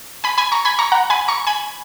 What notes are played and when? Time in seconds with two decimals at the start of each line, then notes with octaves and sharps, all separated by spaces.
0.24 G#5 B5
0.38 G#5 B5
0.52 A#5 C#6
0.65 G#5 B5
0.79 A#5 C#6
0.92 F#5 A#5
1.10 G#5 B5
1.28 A#5 C#6
1.47 G#5 B5